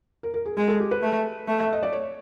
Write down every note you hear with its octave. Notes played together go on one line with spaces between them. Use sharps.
A#4
A#4
G#4
G#3 G#4
A4
G4
B4
A3
A3
E5
D#5
D5
C#5